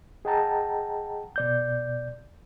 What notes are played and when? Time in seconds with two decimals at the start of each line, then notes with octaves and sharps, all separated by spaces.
0.25 G#4 D#5 F#5 G5 A5 A#5
1.36 B2 D5 G6